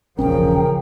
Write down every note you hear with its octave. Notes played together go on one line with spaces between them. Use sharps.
E1 A#1 C#3 F3 C#4 A#4 G5